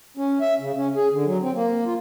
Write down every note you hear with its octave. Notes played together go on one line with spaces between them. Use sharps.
C#4
E5
C#3
C#4
G#4
D3
F#3
C4
A#3
F4